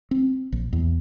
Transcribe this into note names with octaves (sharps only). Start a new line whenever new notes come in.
C4
A#1
E2